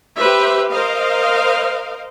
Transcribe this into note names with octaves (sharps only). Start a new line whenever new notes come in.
G4 B4 C5 E5
A#4 C5 D#5 F5